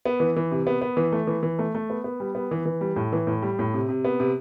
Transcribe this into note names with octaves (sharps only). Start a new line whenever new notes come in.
B3
E3
E3
C3
B3
B3
E3
A3
E3
E3
A3
A3
B3
B3
G3
B3
E3
E3
G3
A2
E3
A2
G3
A2
C3
C3
B3
C3